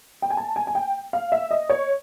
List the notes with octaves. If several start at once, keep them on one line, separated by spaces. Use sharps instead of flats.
G5
G#5
A5
G#5
G#5
G5
F5
E5
D#5
C#5